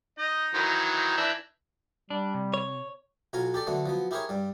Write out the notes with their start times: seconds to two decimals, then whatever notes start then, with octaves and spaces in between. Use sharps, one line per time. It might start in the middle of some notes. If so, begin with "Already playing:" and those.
0.18 D#4 D#5
0.54 D#3 E3 F#3
0.96 D#4
1.17 E3 D4 E5
2.10 G3 D4
2.34 C3
2.54 C#5
3.33 B1 F#3 F4 G#5 A#5
3.54 G4 A4 D5
3.67 D3 F#3 A3 B3
3.86 F3 F#3 B3
4.11 E4 G4 G#4 A#4 C5 C#5
4.29 G2 G3